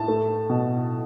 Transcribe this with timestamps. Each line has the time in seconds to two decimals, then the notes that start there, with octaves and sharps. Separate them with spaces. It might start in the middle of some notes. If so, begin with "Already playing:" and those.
Already playing: A2 A5
0.08 A3
0.50 B2